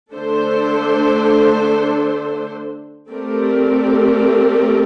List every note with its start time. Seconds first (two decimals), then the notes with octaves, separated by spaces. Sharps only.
0.13 D3 A3 D4 A4 C5
3.11 A3 C4 G4 A#4 D5